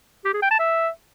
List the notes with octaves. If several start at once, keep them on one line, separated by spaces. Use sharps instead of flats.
G4
G#4
G5
A5
E5